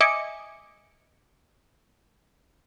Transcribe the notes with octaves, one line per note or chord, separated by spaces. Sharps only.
D#5 E5 G#5 D6 C#7